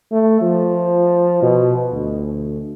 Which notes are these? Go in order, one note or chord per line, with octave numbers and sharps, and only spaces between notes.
A3
F3
B2
D2